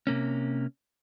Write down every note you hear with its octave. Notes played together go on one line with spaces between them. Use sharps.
C3 A#3 C#4